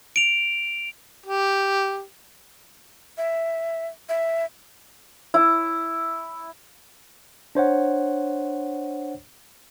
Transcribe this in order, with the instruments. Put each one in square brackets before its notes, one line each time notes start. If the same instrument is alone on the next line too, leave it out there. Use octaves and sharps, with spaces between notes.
[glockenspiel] D7 F7
[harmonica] G4
[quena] E5
E5
[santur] E4
[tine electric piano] D4 C5 C#5 F#5